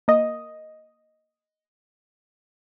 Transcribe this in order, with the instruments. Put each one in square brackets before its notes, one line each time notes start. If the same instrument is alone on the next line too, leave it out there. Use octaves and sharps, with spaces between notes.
[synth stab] A#3 D#5